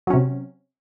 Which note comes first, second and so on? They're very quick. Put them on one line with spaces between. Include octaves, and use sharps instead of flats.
F#3 C#4 C3